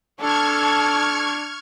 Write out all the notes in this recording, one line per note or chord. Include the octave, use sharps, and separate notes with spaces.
D4 A4 C#6 F6 G#6